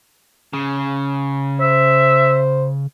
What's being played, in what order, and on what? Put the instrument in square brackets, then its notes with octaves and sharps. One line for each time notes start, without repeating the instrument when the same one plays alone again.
[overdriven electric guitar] C#3
[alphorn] C5 [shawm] E5